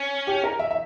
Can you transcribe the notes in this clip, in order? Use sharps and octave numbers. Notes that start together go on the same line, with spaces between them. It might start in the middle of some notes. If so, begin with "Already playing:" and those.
Already playing: C#4
G4
A#4
E5
E5